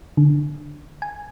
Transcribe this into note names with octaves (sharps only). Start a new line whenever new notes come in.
D3
G#5